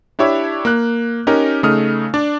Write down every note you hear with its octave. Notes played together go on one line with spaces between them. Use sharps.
D4 E4 G4 C#5 E5
A#3 F#6
C#4 D#4 G4 A#4
C#3 A3 D#4 D#6 F6
D4 D5